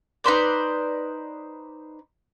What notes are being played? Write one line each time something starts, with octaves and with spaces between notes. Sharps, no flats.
D#4 B4 C5 D5